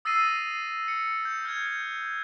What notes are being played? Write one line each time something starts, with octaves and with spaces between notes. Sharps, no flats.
D#6 E6 A6 A#6 C7 D#7
C#7
G6
F6 G6 G#6